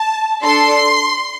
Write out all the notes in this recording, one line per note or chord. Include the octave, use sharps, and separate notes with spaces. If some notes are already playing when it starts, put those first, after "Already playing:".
Already playing: A5
D4 A4 C6